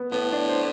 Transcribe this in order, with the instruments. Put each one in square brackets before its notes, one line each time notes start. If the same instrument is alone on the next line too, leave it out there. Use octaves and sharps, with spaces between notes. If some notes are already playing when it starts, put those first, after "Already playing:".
Already playing: [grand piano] B3
[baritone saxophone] A2 [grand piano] B3
[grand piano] D4
C5